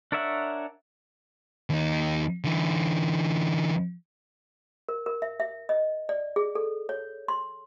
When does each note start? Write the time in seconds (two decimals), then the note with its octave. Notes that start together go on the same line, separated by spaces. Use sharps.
0.12 D4 A#4 C#5 E5 F#5
1.70 D#2 D#4
2.44 D3 E3
4.89 A#4
5.06 A#4
5.22 E5
5.40 E5
5.69 D#5
6.09 D5
6.36 G#4
6.55 A4
6.89 C#5
7.28 C6